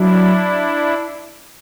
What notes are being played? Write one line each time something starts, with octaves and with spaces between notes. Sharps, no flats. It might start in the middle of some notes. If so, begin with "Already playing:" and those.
Already playing: F#3 D4 E4